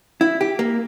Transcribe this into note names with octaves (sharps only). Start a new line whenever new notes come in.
E4
G4
A#3